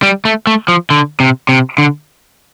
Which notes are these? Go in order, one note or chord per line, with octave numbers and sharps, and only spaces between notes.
G3
A3
A3
F3
D3
C3
C3
D3